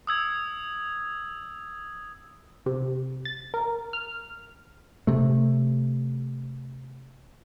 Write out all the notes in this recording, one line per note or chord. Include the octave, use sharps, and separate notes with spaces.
D#6 E6 G#6
C3
A6
A#4
F6
C3 A3